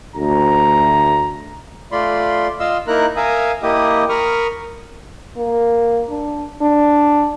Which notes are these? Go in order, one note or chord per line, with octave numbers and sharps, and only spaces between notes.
D2 A#5
A3 F4 D5 B5 C6
F4 D#5 F5 C6 E6
A#3 D#4 E4 A#4 A#5 F#6
A#4 E5 F5 G#5 A#5 D#6
A#3 E4 G4 D#5 D#6
A#4 B5 C#6 D#6 F6
A#3
D4
D4